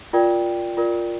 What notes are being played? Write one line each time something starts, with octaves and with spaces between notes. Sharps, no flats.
F4 A#4 D5 G5
F4 A#4 D5